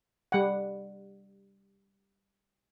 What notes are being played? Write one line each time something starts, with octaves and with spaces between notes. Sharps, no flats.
G3 F#5